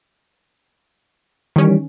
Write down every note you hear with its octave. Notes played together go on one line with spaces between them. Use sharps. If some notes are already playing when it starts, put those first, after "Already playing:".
D#3 E3 G3 C#4